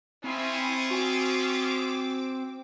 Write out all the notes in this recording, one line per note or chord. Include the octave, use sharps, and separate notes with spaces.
C4 C#4 E4 F4 G#4 G#5
F#4 G#5 D6 E6